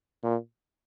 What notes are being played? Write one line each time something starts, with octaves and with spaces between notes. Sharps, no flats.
A#2